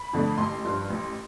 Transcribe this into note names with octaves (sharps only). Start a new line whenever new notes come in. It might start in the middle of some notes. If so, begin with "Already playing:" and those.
Already playing: B5
F2 D3 A3
A1 C6
G2 F3
A1